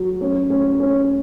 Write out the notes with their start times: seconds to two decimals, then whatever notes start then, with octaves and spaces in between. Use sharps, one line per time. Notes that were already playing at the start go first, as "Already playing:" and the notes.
Already playing: F#3
0.21 C#4
0.50 C#4
0.80 C#4